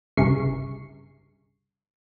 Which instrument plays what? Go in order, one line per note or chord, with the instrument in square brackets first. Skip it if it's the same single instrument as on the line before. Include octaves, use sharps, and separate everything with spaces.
[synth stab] G1 C2 C#3 C#6 C7